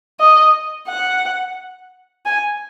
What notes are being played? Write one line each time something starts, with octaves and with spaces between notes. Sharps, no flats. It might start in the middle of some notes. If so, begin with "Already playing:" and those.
D#5
F#5
G#5